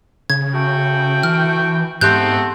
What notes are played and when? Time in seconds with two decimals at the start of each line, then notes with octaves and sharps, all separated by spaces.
0.30 C#3 G#6
0.53 A3 F#4 G5
1.23 E3 F6
2.01 G#2 A3 B3 C4 G4 F#6 G6